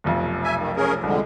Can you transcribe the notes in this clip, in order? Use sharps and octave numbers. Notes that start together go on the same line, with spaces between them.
F1 B1 F2
E5 G#5
D#3
C#4 G#4 A#4
C2 F2 D3 G#3